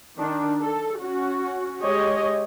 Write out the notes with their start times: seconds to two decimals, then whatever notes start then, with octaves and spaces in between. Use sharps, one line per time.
0.19 D#3 D4
0.61 A4
1.01 C#4 F#4
1.82 G#3 G4 C#5 D#5